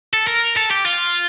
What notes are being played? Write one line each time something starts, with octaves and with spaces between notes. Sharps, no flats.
A4
A#4
A4
G4
F4